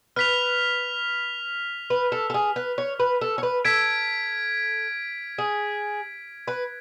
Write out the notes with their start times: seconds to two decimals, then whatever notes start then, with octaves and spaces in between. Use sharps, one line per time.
0.16 B4 F6 B6 F7
1.90 B4
2.12 A4
2.30 A4
2.34 G#4
2.56 B4
2.78 C#5
3.00 B4
3.21 A4
3.38 C#5
3.43 B4
3.65 A4 G#6 B6 D7
5.38 G#4
6.48 B4